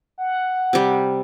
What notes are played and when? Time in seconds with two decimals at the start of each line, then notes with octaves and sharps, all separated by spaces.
0.18 F#5
0.73 C3 G3